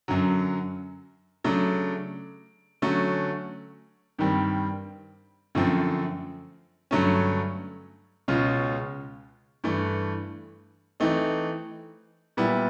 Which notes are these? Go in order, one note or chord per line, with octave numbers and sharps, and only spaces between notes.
F#2 D3 F#3
C#3 F#3 A3 D4
D3 F#3 A3 C#4 F#4
G2 D#3 G3 C4
F#2 D3 F3 A3 C4
G2 D3 F#3 A3 C#4
C#2 B2 G#3 C#4 F4
G2 E3 A3
E3 A3 C4 D#4
A#2 G3 B3 E4